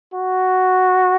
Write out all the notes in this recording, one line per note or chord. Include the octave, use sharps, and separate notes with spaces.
F#4